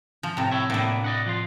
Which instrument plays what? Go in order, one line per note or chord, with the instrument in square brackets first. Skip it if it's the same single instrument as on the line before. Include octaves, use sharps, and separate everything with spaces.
[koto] F3
A2 C3
[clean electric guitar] E4 C#5 E5
[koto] A2 E4 [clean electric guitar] A#3 B3 D4
[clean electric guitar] D5 D#5 F#5
F3 F4 C6